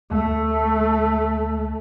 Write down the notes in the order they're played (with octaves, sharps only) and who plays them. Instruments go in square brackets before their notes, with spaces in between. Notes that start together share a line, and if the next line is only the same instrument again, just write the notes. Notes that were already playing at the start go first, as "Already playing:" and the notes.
[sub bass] D2 [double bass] A3